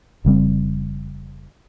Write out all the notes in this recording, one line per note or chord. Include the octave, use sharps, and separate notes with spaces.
F1 C#3 G3 C4